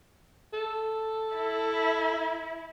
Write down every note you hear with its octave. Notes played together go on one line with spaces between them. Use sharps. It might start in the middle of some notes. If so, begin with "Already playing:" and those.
A4
E4